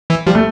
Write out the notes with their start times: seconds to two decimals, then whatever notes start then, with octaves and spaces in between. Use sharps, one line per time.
0.10 E3
0.27 F3 G3
0.35 A3